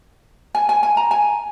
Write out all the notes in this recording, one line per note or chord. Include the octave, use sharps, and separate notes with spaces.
G#5
G#5
G#5
A#5
G#5